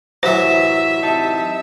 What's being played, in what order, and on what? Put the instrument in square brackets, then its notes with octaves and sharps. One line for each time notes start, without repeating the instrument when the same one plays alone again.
[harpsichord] A1 F#2 E3 [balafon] C5 [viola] E5
[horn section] C3 D#4 A5